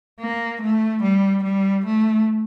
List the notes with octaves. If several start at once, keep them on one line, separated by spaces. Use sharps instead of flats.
A#3
A3
G3
G3
A3